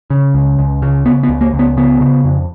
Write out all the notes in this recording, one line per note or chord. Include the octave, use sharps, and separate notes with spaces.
C#3
C#2
C#2
C#3
C#3 B3
B3
C#2
A#3
C#2
B3
C#3 B3
C#3
F2